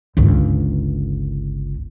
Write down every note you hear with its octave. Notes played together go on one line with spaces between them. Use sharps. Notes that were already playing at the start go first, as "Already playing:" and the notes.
G1 C#2